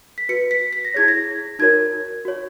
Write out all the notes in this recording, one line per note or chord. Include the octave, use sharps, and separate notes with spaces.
B6
F#4 B4 C#7
B6
B6
A#6
E4 G#4 C#5 G#6
A#6
D#4 F#4 A#4 C#5 G#6
F#4 C#5